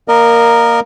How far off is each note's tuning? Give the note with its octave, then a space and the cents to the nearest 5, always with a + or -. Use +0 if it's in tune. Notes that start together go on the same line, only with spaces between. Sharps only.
A#3 +0 A#4 +0 D#5 -35